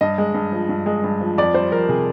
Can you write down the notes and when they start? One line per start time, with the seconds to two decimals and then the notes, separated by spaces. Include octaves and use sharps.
0.01 G2 D#5
0.18 G#3
0.34 G2
0.52 F3
0.69 G2
0.86 G#3
1.04 G2
1.20 F3
1.38 F2 D5
1.54 G3 C5
1.72 F2 A#4
1.89 C3 G#4